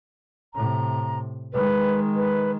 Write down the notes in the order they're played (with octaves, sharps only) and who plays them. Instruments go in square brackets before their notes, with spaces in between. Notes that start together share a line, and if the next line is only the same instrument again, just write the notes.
[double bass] A2 C3 [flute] A#5
[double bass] D#3 G#3 [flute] B4
[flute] B4